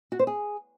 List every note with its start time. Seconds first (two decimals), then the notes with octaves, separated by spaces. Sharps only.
0.12 F#4
0.19 C5
0.27 G#4